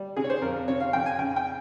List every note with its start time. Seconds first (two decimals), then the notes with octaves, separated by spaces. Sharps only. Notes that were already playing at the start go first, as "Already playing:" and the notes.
Already playing: G3
0.17 C3 G#4
0.24 C#5
0.30 C5
0.42 F2 A#4
0.68 C3 C#5
0.80 F5
0.93 F2 G5
1.06 G#5
1.19 C#3 G5
1.36 G5